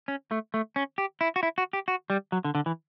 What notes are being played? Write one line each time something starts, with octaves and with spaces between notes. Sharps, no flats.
C#4
A3
A3
C#4
G4
E4
F#4
E4
F#4
G4
F#4
G3
F#3
D3
D3
E3